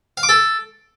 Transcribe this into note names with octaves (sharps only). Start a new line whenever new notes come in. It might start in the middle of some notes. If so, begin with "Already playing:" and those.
F5
D6
A4